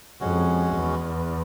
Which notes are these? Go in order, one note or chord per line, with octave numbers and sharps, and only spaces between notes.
F2 G#3 C#4 F#4
E2